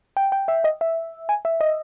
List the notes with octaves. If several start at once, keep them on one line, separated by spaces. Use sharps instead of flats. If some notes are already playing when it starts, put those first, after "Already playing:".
G5
G5
E5
D#5
E5
G#5
E5
D#5